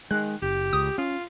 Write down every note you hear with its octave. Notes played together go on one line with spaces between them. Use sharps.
D#3 G#3 F#6
F#1 G4
C#2 D#6
C#4 F4